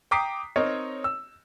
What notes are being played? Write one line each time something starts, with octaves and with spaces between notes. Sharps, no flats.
G5 A#5 D6 D#6 B6 C7
C4 D#4 A#4 C#5 D#5
E6